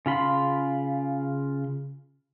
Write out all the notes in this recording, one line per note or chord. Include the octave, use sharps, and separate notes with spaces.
C#3 F4 B5 C6